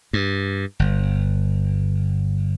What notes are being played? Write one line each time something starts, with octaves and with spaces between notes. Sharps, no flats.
G2
G1